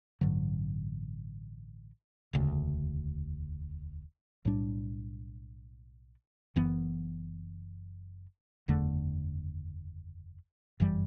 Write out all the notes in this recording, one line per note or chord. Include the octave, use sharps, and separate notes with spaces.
A1 G2 D3 F#3
E1 D2 C#3
B1 A2 G3 D4
F#1 F#2 E3 B3
F#1 E2 D3 A3
G1 F#2 E3 G3